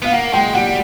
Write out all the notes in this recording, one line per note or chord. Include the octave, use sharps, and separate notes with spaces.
B3 F5
A#3 F#5
G#3 G5
G3 F#5